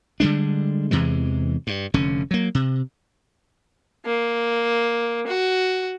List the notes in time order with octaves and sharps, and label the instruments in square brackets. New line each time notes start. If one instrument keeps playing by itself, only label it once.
[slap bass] D3 G3 G#3 D4
E2 C3 E3 G#3
G2
F1 D3 C#4
F#3 A#3
C3
[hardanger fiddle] A#3
F#4